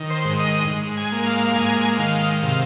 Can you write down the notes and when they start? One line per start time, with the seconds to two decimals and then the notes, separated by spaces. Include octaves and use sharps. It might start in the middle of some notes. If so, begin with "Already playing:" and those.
Already playing: D#3
0.10 C5
0.25 G#2
0.40 D#5
0.68 G#2
0.97 G#5
1.12 A#3
1.26 F5
1.46 F5
1.55 G#2 G#5
1.99 D#3 F5
2.43 C3 F5